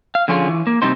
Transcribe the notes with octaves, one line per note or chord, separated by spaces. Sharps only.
F5
D3 F3 C#4 F4 G4 G#4
E3
A#3
C3 G3 C4 D#4 C5